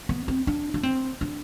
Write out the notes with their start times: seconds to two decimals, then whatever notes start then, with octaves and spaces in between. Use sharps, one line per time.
0.09 B3
0.28 C4
0.47 D4
0.74 D4
0.83 C4
1.21 D4